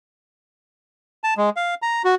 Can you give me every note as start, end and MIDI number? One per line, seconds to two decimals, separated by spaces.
1.24 1.34 81
1.37 1.50 56
1.56 1.75 77
1.82 2.02 82
2.04 2.15 66